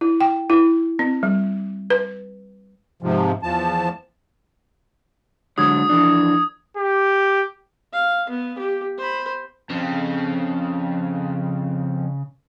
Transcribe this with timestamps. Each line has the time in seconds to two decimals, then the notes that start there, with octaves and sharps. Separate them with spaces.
0.01 E4
0.21 G5
0.50 E4
0.99 C4
1.23 G3
1.90 B4
3.02 G#2 C3 F3
3.43 E2 F3 A5
5.58 D3 F#3 G#3 D#6 G#6
5.89 E3 F3 D4
6.78 G4
7.93 F5
8.29 B3
8.58 G4
8.98 C5 B5
9.70 F2 C#3 C4